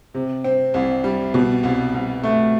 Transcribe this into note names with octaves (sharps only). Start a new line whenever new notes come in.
C3
C4
C2
G3
B2
C2
C2
A3